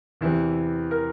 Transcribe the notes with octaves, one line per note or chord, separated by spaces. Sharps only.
E2 C3 E3 E4
A#4